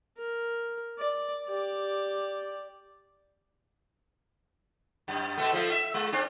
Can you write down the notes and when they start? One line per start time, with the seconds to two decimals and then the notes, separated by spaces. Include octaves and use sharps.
0.18 A#4
0.99 D5
1.47 G4 D5
5.08 F#2
5.38 B2 A3
5.53 F3 A3
5.71 E5
5.94 G#3
6.12 C4 D4